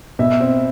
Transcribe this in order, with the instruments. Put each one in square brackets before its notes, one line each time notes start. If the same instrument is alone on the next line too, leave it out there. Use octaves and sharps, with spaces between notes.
[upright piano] B2 [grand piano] E5
[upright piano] C4